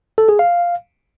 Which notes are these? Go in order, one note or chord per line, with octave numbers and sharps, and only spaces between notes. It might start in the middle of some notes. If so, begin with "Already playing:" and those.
A4
G#4
F5